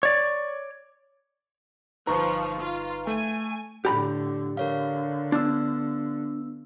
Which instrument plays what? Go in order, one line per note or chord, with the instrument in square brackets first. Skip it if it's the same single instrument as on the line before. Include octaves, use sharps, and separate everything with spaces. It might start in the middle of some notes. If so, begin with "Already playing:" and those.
[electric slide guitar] C#5 D5
[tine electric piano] G1 D#4 [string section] F3 [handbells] B4 C#6 [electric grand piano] A#5
[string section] F4
[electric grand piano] A3 [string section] G#5
[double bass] A2 D3 [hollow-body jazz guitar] G4 A#5 B5
[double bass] D3 [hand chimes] A#4 C#5 F5
[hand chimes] B3 E6 [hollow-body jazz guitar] D4